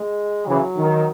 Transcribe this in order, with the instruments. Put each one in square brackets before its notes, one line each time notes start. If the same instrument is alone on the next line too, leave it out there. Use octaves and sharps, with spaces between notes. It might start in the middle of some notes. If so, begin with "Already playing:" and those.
Already playing: [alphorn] G#3
[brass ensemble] C#3 E3 [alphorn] F#3
[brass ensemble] D#3